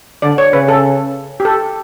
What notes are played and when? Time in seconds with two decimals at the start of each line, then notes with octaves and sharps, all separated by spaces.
0.22 D3 D5
0.38 C#5
0.53 C#3 B4
0.68 A4
1.40 G4
1.45 A4